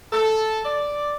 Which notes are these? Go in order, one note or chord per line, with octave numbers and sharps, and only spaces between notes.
A4
D5